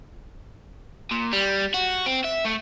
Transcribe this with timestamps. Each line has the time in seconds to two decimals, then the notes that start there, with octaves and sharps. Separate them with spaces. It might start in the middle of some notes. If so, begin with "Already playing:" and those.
1.11 A#2
1.33 G3
1.74 F#4
2.06 C4
2.25 E5
2.45 A3